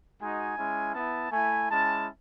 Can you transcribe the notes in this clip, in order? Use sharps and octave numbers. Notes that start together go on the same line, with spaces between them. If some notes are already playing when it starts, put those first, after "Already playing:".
G#3 D#4 F#4 G#5
G#3 C#4 E4
B3 E4 A5
A3 E4 G#5
G#3 C#4 E4 A5